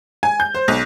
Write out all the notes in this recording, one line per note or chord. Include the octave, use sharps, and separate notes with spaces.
G#5
G6
C5
B1